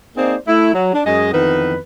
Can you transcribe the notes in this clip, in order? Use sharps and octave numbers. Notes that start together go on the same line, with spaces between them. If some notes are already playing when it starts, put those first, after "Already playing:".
A#3 C4 D#4 G#4 C5 D5
A3 E4
F#3
D4
F#2 G#3 G#4 D#5
F2 D#3 E3 B3 B4